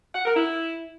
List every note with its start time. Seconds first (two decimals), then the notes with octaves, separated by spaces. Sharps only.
0.15 F#5
0.26 A#4
0.36 E4